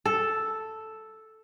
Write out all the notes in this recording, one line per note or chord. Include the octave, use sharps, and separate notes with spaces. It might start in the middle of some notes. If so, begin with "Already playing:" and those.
A4